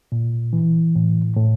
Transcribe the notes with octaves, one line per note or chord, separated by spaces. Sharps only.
A#2
E3
A2
A2